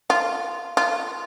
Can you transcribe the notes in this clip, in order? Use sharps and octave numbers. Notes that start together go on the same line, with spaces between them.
F4
F4